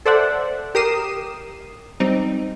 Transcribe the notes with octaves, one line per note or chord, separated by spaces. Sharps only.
A4 C5 D5 E5 F#5
G4 A#4 D#6 C7 E7
G3 C4 D#4